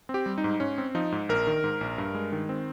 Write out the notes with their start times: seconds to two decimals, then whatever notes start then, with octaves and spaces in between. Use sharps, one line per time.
0.09 C4
0.14 G4
0.26 G3
0.38 D#4
0.44 G#2
0.60 G#2 C#4
0.78 C4
0.95 F3 D#4
1.12 G#2
1.29 A#1 A#4
1.47 D#3
1.64 G#2
1.81 A#1
1.98 G2
2.15 G#3
2.32 D#3
2.49 C4